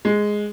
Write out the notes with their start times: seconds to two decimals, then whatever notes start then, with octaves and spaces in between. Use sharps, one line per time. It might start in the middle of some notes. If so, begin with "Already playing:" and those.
0.05 G#3